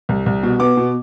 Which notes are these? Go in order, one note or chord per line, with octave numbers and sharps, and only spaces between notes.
C2
C2
B2
B3 D6
B2